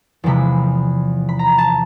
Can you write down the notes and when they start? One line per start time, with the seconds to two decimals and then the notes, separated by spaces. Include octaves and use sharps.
0.24 E2 C3 F3 G#3 B5
1.29 B5
1.39 A#5
1.58 A5